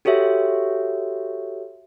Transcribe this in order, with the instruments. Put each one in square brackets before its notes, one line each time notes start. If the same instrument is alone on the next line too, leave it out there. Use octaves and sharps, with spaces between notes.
[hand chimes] F#4 G4 A4 C#5 E5